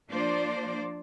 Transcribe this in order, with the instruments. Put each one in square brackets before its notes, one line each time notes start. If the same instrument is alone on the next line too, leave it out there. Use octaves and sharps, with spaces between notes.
[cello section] F3 A#3 D4 C5 D5